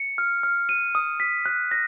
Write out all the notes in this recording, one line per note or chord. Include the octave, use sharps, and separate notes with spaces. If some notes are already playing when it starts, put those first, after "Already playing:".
Already playing: C#7
F6
F6
D#7
D#6
B6
F#6
A#6